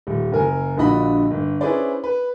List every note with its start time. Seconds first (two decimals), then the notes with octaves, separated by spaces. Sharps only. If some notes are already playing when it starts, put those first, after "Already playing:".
0.07 D#1
0.32 F#1 A#4 G#5
0.77 A#1 A#2 D3 F#4 D#5 B5
1.31 G1
1.61 C#4 E4 G#4 B4 C5 D5
2.04 B4